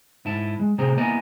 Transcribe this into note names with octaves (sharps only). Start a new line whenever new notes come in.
G#2 E4 A5
G#3
A2 C3 C4 G#4 C5 A#5
A#3 B3 E4 D#5 G#5 A#5